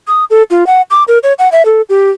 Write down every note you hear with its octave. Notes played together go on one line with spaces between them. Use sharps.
D#6
A4
F4
F#5
D6
A#4
C#5
F#5
E5
A4
G4